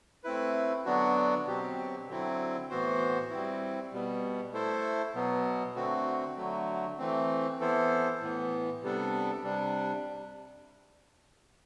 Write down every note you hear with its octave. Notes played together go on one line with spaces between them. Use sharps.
A3 C4 E4 B4
D3 F#3 B3 D4 F#4
B2 F#3 C4 G4
D3 F#3 C4 E4
A2 E3 B3 F#4 C5
G3 C4 E4
B2 G3 B3
A3 E4 A4 C5
B2 F#3 B3
D3 A3 C4 F#4
D3 F#3 A3
E3 A3 C4
E3 B3 E4 A4 C5
A2 E3 B3
C3 G3 B3 D4 A4
C3 G3 D4